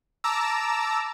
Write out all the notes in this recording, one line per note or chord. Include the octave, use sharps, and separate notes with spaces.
A5 A#5 D6 E6